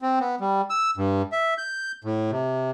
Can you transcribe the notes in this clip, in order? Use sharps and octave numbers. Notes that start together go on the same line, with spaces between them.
C4
B3
G3
E6
G2
E5
G6
A2
C3